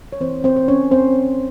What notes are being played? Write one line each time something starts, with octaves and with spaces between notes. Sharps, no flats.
C#5
E3 A#3 C4 C5
C4 C5
C5
C#4 C#5
C4 C5